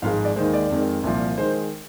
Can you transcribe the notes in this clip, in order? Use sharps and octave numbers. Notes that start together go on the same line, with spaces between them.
G#1 G#2 F3 G#3 F5
D5
D#2 D#3 G#3 C5
D5
F2 D#3 G#3
C2 A#2 F3
D#3 G#3 C5